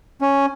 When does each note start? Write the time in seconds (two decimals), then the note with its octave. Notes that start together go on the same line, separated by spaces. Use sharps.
0.21 C#4